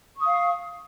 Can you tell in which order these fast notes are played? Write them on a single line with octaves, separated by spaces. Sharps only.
C#6 D#6 F5